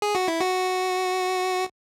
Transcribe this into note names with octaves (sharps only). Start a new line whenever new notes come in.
G#4
F#4
E4
F#4